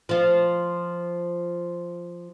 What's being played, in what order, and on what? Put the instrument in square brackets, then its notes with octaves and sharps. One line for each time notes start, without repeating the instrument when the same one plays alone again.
[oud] F3 F4